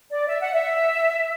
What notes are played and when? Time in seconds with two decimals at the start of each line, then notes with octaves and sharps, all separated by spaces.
0.10 D5
0.28 E5
0.41 F#5
0.53 E5